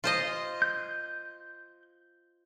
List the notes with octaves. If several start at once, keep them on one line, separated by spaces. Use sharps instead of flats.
F4 C5 D#5
G6